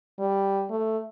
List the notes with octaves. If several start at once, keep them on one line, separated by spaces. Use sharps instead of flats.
G3
A3